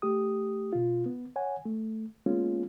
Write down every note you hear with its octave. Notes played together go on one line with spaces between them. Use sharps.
A3 G4 D#6
B2 F4
B3
C#5 F#5 G#5
A3
G#3 A#3 B3 C#4 F4